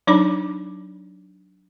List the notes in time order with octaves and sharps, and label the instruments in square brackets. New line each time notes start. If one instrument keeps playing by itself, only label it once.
[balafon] F#3 D4 D#4 D5 B5 D6